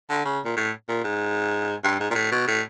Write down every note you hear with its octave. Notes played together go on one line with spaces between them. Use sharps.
D3
C#3
A#2
A2
A#2
G#2
G2
G#2
A#2
A2
B2
A2